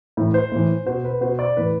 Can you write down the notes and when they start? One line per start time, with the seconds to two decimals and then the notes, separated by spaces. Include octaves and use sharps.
0.17 A2 E3
0.34 C5
0.52 A2 E3
0.86 B2 C5
1.05 B4
1.21 B2 C5
1.39 D5
1.57 A2 E3 B4